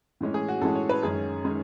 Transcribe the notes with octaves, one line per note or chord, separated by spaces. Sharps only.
A2 E3 G#3 C#4
G#4
F#4
A2 E3 G#3 C#4 A4
C#5
B4
F#2 D#3 G#3 C#4 G#4
D#3 G#3 C#4